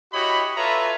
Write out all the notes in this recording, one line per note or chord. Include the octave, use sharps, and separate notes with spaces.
E4 F#4 G4 C#5 D#5 B5
F4 A4 B4 C#5 E5 A#5